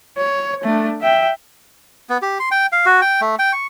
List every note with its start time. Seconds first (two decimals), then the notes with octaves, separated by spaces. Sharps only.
0.18 C#5
0.64 A3 D4
1.01 E5 G5
2.09 B3
2.22 G4
2.40 C6
2.51 G5
2.72 F5
2.86 F#4
3.01 G5
3.21 A3
3.39 G5
3.53 C#6